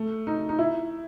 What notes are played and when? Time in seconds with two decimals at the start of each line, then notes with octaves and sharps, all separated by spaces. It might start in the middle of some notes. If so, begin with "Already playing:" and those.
Already playing: A3
0.27 D#4
0.49 D#4
0.59 E4